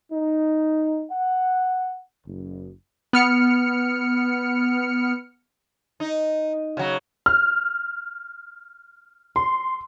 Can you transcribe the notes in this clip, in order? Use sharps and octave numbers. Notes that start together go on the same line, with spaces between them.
D#4
F#5
F#1
B3 F6 C#7
D#4
C#3 F#3
F6
C6